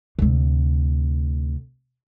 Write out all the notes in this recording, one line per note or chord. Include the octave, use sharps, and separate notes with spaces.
D2 C3